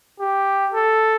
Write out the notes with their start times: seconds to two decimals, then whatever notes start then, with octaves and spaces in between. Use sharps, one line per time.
0.20 G4
0.74 A4